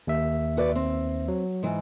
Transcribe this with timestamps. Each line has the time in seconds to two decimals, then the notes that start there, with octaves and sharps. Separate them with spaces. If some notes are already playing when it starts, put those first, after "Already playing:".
0.07 D#2 E5
0.57 F#4 B4 D5
0.75 C4
1.28 F#3
1.63 G#2 E3